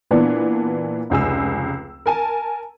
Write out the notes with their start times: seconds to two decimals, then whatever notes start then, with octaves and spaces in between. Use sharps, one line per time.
0.11 A#2 E3 B3 D4
1.10 F1 C#2 G#5 E6
2.06 A#4 G#5 A5